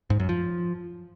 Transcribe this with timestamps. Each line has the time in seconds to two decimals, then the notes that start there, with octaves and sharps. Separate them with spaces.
0.10 G#2
0.20 F#2
0.29 F3